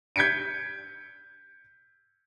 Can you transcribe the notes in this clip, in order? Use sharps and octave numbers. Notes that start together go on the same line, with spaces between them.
G6 G#6 B6 C#7 D7